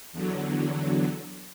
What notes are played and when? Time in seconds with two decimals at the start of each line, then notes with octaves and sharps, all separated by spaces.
0.12 E2 D3 F#3